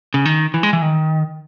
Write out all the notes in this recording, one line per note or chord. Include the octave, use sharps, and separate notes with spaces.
C#3
D#3
E3
G#3
E3
D#3